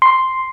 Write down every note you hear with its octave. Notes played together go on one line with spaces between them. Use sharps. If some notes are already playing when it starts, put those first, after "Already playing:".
C6